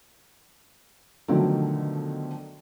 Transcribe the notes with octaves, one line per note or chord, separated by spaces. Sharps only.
B2 D3 D#3 F3 F#3 A3